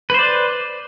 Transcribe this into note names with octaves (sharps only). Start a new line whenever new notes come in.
B4 C5 D5